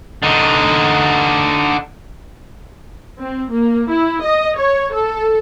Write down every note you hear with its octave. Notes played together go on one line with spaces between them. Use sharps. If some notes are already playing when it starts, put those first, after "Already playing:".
D3 D#4
C4
A#3
E4
D#5
C#5
A4